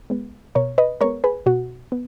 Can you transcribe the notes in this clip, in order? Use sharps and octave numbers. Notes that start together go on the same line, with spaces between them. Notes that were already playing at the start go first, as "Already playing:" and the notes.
G#3 B3
B2 A#4 C#5
B4 D#5
G#3 B3 A#4 C#5
G#4 B4
B2 F#4
B3